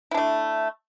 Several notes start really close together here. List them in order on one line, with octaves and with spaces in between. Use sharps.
E4 D4 A3